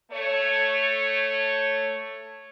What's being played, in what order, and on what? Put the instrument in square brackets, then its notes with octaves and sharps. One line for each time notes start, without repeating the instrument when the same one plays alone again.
[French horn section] A3 C#5